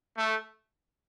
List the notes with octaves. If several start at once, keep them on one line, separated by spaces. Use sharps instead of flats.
A3